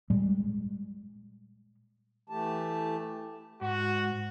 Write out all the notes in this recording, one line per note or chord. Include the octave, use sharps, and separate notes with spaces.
A#2 G3 G#3
E3 A3 G4 A5
G#2 F#4